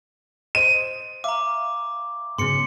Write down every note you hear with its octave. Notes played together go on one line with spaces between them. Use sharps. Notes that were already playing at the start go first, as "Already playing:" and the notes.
C5 D#5 D#7
E5 F5 A#5 D6
G#2 C#3 F#3 B3 G#4 C6 C#7